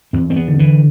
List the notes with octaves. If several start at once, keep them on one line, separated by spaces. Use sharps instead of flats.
E2 C4
C4
B3
D3
E3